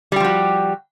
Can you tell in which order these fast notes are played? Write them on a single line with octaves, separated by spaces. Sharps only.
G3 G4 F3 F#4